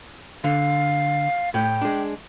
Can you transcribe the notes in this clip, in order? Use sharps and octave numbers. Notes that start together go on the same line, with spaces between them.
D3 F5
A2 G5
G#3 D4